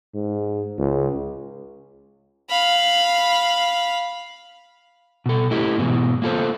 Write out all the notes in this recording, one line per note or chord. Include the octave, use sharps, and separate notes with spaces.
G#2
C#2
F5 B5
B2 A4
A3 E4 G4 A4 D#5
G#2 B2 E3
A#3 F4 A4 C5